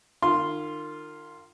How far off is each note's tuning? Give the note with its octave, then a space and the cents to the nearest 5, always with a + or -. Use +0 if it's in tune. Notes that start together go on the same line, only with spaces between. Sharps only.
D#3 -35 F4 +0 C6 +0